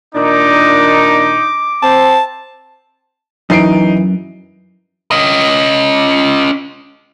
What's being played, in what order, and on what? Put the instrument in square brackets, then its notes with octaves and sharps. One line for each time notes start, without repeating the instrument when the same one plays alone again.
[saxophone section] A#2 D#3 D4 [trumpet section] D#4 [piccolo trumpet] D6
[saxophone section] C4 [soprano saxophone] A5
[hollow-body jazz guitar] F#2 [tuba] E3 [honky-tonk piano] D#4 C7 D7
[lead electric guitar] C#4 D#5